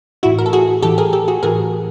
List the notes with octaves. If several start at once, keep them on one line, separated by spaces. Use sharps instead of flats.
A2 E3 E4 F#4
A#4
A4
F#4 G#4
A2 E3 G4 A4
G#4 A#4
G4 A4
F#4 G#4
A2 E3 G#4 A#4